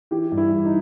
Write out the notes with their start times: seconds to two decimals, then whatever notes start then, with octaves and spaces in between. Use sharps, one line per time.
0.11 E3 G4
0.32 G2
0.37 E4
0.51 E3
0.65 D#4